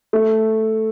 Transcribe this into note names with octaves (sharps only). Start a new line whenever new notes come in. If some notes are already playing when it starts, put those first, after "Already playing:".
A3